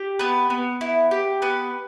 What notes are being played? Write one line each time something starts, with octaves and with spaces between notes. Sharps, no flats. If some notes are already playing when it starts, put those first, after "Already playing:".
Already playing: G4
B3 B4
B3
E4
G4
B3 B4